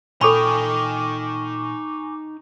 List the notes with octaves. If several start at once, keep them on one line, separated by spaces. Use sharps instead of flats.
A#2 D#4 A4 G5 G#5 B5 C#6 D6